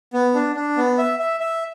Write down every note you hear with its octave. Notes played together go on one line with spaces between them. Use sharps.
B3
D4
D4
B3
E5
E5
E5